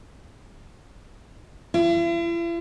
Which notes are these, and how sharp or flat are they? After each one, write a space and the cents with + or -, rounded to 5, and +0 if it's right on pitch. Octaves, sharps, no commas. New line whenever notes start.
E4 +45